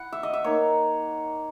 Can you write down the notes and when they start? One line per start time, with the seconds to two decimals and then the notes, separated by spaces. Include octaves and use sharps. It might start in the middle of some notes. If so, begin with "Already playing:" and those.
Already playing: E4 F#5
0.13 E5
0.23 D#5
0.33 E5
0.44 A#3 D#4 C#5